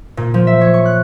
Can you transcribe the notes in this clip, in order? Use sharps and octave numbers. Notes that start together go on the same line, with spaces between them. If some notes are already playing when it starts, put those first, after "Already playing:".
A#2
F3
E5
C#5
C#6
F#6